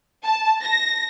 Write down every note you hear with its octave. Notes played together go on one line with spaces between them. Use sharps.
A5
A#6